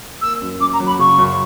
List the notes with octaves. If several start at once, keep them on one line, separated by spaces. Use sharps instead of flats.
A#3 E6
F#2
F#2 D6
A#5
F#3
B5
C#3 C#6
F#2